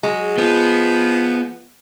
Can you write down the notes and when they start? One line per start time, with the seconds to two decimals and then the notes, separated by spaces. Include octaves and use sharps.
0.03 F#3 G#3
0.38 F3 B3